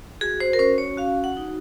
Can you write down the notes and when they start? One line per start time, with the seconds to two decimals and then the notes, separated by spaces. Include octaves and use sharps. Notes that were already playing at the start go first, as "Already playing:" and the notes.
0.21 F#4 G#4
0.40 C5
0.53 A#4
0.59 C#4 C5
0.78 C#5
0.97 F#4 F5
1.24 F#5
1.37 D#4